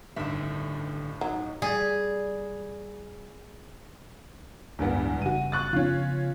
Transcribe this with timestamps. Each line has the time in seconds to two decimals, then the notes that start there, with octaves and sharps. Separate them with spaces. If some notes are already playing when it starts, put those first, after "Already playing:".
0.16 A1 G2 D3 D#3 E5
1.21 F#3 D#4
1.62 G3 G#4
4.79 D1 E2 G2 E3 G#3 B3
5.22 F#1 C#3 G3 F#4 D#7
5.52 C#6 F#6 A6
5.73 C#3 F3 B3 C#4 F4